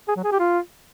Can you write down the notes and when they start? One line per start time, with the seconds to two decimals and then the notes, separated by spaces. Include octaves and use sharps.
0.08 G#4
0.16 F#3
0.24 G#4
0.32 G4
0.40 F4